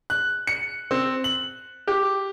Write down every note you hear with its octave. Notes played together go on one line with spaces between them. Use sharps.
F#6
C#7
C4
F#7
G4